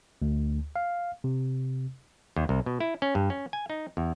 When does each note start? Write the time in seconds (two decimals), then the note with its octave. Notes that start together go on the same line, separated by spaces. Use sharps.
0.22 D2
0.76 F5
1.24 C3
2.36 D#2
2.49 C2
2.66 B2
2.80 E4
3.02 C#4
3.15 G2
3.30 C#4
3.53 G#5
3.70 D#4
3.97 E2